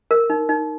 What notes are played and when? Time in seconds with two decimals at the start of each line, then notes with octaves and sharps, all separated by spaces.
0.11 A#4
0.30 D#4
0.49 D#4